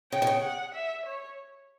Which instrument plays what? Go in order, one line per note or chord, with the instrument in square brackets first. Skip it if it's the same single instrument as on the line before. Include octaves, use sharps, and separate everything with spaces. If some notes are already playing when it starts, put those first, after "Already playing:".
[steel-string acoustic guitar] C#3 [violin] G5
[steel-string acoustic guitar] B2
C#3
[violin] F#5
E5
C#5